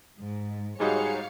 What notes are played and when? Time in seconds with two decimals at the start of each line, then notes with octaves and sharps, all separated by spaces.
0.21 G#2
0.80 G#2 G3 D#4 F#4 G#4 C#5 F5 C#7